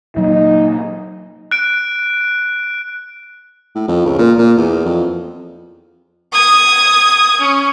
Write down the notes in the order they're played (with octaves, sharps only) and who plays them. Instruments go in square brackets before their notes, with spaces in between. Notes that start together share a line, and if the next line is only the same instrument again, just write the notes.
[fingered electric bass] A#2 F#3 A#3 [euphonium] D#4
[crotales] F#6 D7
[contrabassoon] A2
F2
C#2
A#2
A#2
E2
F2
[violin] D#6 G#6
C#4